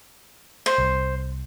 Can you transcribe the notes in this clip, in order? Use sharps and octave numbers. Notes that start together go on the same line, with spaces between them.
C5
C2